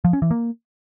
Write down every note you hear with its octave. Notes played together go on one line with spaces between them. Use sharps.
F3
C#4
E3
A#3